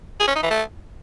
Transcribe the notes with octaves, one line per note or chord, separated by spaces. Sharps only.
G#4
C#4
D#4
E3
A3